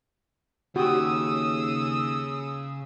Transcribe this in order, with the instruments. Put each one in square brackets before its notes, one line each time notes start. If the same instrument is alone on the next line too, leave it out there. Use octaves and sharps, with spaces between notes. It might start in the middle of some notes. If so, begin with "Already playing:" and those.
[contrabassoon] D#2 [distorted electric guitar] C#3 [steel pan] F#4 G4 [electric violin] D#6 E6